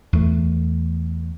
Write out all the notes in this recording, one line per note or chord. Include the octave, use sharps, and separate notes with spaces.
E2 A3